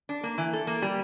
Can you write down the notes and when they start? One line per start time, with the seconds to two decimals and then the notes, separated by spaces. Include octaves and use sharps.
0.09 D4
0.23 A#3
0.38 E3
0.53 A4
0.67 A#3
0.82 G3